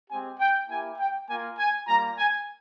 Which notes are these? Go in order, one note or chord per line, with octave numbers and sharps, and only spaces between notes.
G#3 C4 G4 G#5
G5
A#3 E4 G4 G#5
G5
A#3 F4 G#5
G#5
G3 A#3 F4 A#5
G#5